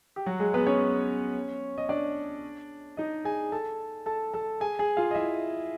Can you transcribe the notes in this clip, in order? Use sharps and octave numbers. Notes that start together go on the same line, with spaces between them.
G4
F#3 F#4
G#3 G#4
B3 B4
C#4 C#5
D#5
D4 D5
D#4 D#5
G#4 G#5
A4 A5
A4 A5
A4 A5
G#4 G#5
G#4 G#5
F4 F5
D#5
E4 E5